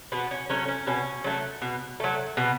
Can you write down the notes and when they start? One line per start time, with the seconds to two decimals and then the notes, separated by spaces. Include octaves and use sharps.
0.12 B2 B3
0.31 C#4
0.50 F#3 A3 C#4
0.68 C#4
0.87 B2 C#4
1.24 F#3 A3
1.62 B2
2.00 F#3 A3
2.37 B2